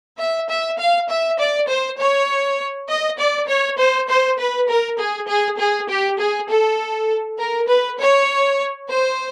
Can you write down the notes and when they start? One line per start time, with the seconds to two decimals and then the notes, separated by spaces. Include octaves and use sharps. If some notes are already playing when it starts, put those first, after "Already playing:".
0.19 E5
0.49 E5
0.78 F5
1.09 E5
1.38 D5
1.68 C5
1.98 C#5
2.89 D#5
3.18 D5
3.48 C#5
3.78 C5
4.08 C5
4.39 B4
4.68 A#4
4.99 G#4
5.28 G#4
5.59 G#4
5.89 G4
6.18 G#4
6.49 A4
7.38 A#4
7.68 B4
7.99 C#5
8.89 C5